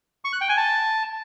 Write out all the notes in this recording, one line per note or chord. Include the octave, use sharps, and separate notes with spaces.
C#6
F#6
G5
G#5
A5